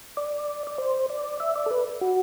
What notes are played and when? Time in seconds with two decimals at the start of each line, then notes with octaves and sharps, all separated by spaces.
0.17 D5
0.67 D5
0.78 C5
1.10 D5
1.40 E5
1.56 D5
1.66 A4
1.71 B4
2.01 F#4